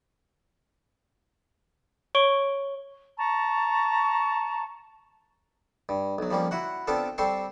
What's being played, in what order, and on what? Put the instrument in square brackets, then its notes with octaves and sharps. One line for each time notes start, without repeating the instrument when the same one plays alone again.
[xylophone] C#5 C#6 D7 G7
[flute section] A5 A#5 C#6
[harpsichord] G2
B1 F#3
F3 G3 A#3 C#4
E4 F#4 F#5
B3 C4 D4 F4 A4
G3 C4 A4 C6 C#6